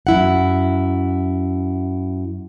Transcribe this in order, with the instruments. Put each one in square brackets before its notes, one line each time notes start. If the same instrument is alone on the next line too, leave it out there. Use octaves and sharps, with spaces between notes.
[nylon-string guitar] F#2 E4 F#5